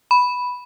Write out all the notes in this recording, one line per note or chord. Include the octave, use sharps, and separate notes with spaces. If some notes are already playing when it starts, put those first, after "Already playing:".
B5